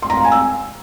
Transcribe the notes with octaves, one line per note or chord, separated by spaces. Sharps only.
C6
A#5
F5
G#5
E6